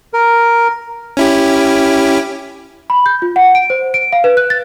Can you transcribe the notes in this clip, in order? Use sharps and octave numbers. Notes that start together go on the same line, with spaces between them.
A#4
C#4 E4 G4
B5
G6
F4
F#5
D7
C5
D7
F5
B4
F#6
A6